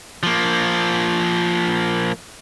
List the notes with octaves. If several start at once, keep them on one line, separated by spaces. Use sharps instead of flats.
F3 A#3